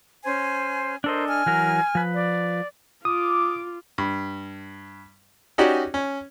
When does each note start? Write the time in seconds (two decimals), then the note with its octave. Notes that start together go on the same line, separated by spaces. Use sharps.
0.24 C#4 C5 G#5
1.04 D4 A4 A#4 C5 D#5
1.28 G#5 F6
1.46 E3 F#3 A#4
1.95 F3 B4
2.12 D5
3.05 F4 D6 D#6
3.98 G2
5.58 C#4 D#4 F#4 G4 D5
5.94 C#4